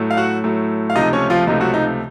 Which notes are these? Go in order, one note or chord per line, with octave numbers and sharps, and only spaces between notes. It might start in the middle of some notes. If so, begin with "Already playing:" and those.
Already playing: A2 F#3 A3
F5
F#4 F#5
A2 F#3 A3
F5
C#2 C3 F3 A3 D#4 D#5
C#4 C#5
F3 F4
C#2 C3 F3 A3 D#4
F#3 F#4
D#4